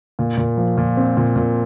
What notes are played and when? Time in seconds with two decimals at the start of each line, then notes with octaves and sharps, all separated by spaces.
0.19 A#2
0.37 A#2
0.57 F3
0.77 A#2
0.97 C4
1.17 A#2
1.36 A#2